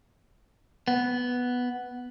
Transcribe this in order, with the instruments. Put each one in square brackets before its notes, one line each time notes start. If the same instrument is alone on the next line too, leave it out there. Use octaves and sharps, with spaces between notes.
[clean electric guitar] B3